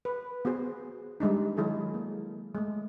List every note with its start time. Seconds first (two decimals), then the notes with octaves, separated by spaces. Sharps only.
0.05 B4
0.45 B3 F#4 G#4 C5
1.20 G3 G#3 D4 D#4
1.57 D#3 F#3 G#3 E4 G#4 A4
1.94 A#3
2.55 G#3 A3